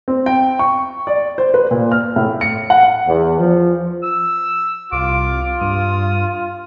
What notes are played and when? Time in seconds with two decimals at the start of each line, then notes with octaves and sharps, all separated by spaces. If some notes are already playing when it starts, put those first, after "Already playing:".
0.08 C4
0.26 G5
0.59 C#6
1.07 D5
1.38 C5
1.54 B4
1.71 A#2
1.92 F6
2.16 A2
2.41 C#7
2.70 F#5
3.06 E2
3.38 F3
4.03 E6
4.92 C2 F4 D6
5.61 G2 D#6